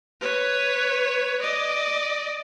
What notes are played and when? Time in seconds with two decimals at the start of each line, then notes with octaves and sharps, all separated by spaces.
0.20 B4 C#5
1.41 D5 D#5